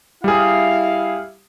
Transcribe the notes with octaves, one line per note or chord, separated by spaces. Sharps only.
G3 E4 G#4 F5